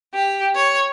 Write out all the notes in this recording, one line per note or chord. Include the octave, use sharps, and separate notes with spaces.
G4
C#5